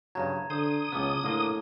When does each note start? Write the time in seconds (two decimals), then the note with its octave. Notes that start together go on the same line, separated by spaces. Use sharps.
0.15 G2 C#3 F#3 A5 A#5 G#6
0.50 D3 C5 D#6
0.92 C#2 C#3 B3 A5 D6 F6
1.24 A2 D3 A#3 D4